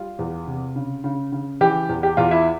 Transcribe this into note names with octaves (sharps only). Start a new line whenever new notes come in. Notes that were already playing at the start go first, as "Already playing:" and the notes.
Already playing: G3 F4
E2
C3
C#3
C#3
C#3
E3 G4
E2
G4
E2 F4
E4